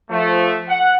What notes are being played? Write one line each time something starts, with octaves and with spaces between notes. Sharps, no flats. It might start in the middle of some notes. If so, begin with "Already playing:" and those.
F3 A3
F#5